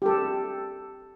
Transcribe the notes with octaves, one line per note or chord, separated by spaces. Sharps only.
G4 A4